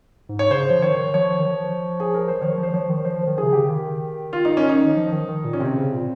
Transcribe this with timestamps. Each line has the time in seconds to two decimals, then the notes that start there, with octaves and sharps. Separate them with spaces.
0.29 G#2
0.39 C#5
0.51 C#3 C5
0.71 F3
0.82 D#3 C#5
1.14 F3 C#5
1.40 D#3
1.46 F3
2.00 G#4
2.14 A#4
2.28 C5
2.42 D#3 C#5
2.58 F3
2.63 C5
2.74 F3 C#5
2.90 D#3
3.05 F3 C5
3.27 D#3
3.38 G#4
3.43 C3
3.48 C#3 G4
3.69 D#3
4.33 F4
4.45 D#4
4.57 C#4
4.69 D#4
4.96 F3
5.12 D#3
5.28 D#3
5.45 A#2
5.53 C#4
5.60 C3 C4
5.76 C#3
5.92 A#2